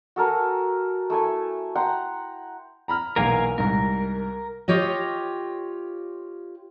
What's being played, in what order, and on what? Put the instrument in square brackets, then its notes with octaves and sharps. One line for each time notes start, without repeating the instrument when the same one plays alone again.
[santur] F#4 A4 A#4 G#5
A3 E4 A4 G#5
F#5 G5 A#5 C6
[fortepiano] A#5 B5 F6
[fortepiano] B1 E2 A#3 [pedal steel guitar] A#4 F5 G#5
[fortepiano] C2 G#2 [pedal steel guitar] A#4
[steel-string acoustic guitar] F4 G4 C#5 D#5